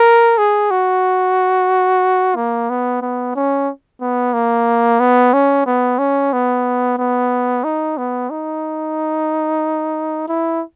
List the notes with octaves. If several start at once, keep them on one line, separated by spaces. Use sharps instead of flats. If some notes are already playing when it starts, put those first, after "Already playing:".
Already playing: A#4
G#4
F#4
A#3
B3
B3
C#4
B3
A#3
B3
C#4
B3
C#4
B3
B3
D#4
B3
D#4
E4